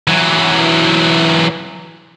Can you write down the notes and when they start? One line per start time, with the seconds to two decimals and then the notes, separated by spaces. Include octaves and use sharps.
0.08 E3 F#3